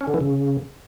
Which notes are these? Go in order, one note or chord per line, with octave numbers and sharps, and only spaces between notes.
C#4
D3
E3
C#3